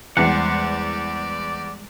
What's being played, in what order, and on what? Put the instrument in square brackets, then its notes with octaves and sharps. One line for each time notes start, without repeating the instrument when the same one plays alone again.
[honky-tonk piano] E2 [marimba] G3 G#3 [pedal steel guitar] C5 F#5 [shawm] D5